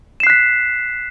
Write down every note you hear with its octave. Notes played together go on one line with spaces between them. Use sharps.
F#6 B6 C7 E7